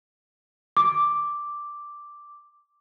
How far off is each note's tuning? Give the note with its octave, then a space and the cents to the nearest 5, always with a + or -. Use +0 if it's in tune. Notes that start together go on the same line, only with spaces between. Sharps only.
D6 +0